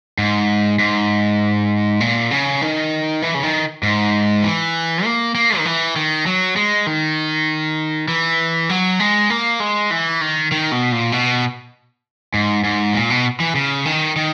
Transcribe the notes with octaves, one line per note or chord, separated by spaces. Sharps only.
G#2
G#2
A#2
C#3
D#3
E3
C#3
D#3
G#2
E3
A#3
A#3
D#3
E3
D#3
F#3
G#3
D#3
E3
F#3
G#3
A#3
G#3
E3
D#3
D#3
B2
A#2
B2
G#2
G#2
A#2
B2
E3
C#3
D#3
D#3